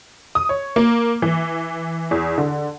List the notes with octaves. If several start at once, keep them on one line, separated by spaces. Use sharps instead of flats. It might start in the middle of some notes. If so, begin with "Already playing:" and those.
D#6
C#5
A#3
E3
E2
D3